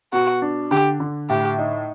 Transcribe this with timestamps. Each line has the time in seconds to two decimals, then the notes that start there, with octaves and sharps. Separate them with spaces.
0.13 B2 F#4
0.42 D4
0.71 D3 G4
1.00 D3
1.30 A2 G4
1.58 D#4